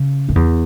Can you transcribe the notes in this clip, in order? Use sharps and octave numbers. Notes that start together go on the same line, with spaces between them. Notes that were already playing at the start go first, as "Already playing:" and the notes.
Already playing: C#3
F#2
E2